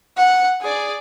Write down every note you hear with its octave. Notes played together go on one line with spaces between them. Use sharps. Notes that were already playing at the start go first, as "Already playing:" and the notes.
F#5
G#4 D5